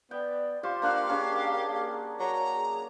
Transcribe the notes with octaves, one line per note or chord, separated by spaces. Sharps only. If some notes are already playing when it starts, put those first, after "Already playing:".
B3 D5 G5
F4 G4 C5 C6 C#6
A#3 D4 F5 F#5
A#3 C#4 D4 G#4
F#3 A#5
G#4